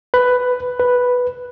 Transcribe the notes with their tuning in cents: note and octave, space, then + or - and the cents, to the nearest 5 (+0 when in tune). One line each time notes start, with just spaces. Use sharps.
B4 +10
B4 +0